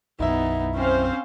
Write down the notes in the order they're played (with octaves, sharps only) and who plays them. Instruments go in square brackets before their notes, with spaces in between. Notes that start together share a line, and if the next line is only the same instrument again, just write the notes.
[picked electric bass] B1 F#2 [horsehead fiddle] B3 D#4 [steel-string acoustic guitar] E4 E5
[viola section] C4 C5 F5 [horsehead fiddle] C#4